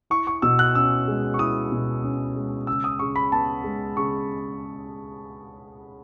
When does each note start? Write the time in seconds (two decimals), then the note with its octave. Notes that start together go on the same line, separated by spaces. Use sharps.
0.10 E4 C#6
0.27 C#6
0.42 B2 E6
0.59 F#6
0.75 C#4 E6
1.08 G#3
1.34 C#6
1.39 E4 D#6
1.72 B2
2.04 C#4
2.36 G#3
2.67 C#3 E6
2.84 D#6
2.99 C#3 C#6
3.16 B5
3.32 B3 A5
3.64 G#3
3.97 C#3 C#6